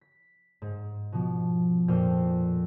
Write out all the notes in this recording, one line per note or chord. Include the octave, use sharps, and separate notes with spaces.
B6
G#2
B2 F3
F2 A#2 C5 G5 F6